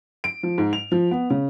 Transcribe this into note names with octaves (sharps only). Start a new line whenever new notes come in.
D7
F3
G#2
F7
F3
B3
C#3